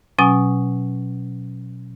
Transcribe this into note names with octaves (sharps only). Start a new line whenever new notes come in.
B2 F#3 C#4 G#5 D#6